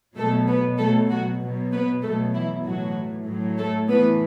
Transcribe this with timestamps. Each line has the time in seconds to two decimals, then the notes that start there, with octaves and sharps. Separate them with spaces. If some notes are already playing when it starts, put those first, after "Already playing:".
0.16 B2 F#3 A3 A4
0.47 B3 B4
0.78 B2 F#3 A3 A4
1.09 F#3 F#4
1.41 B2 F#3
1.71 B3 B4
2.02 B2 F#3 A3 A4
2.34 E3 E4
2.65 A2 E3 F#3 F#4
3.26 A2 F#3
3.57 A3 A4
3.89 A2 E3 B3 B4